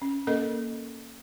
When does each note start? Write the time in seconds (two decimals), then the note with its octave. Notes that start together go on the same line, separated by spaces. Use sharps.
0.02 C#4
0.27 A#3 C#4 A4 A#4 D#5